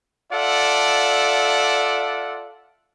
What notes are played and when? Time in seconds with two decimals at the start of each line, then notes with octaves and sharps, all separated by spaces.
0.32 F4 A4 D5 E5 F#5